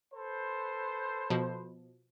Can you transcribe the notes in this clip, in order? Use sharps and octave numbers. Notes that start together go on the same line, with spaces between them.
A4 B4 C5
B2 F3